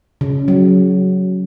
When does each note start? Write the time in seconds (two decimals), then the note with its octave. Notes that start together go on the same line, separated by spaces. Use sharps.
0.21 C#3
0.48 F#3